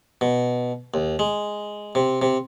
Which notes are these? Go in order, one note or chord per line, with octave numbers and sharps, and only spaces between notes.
B2
D#2
G#3
C3
C3